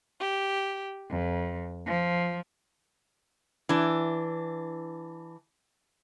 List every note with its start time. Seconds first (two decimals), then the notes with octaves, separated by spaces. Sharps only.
0.19 G4
1.09 F2
1.86 F3
3.69 E3 D4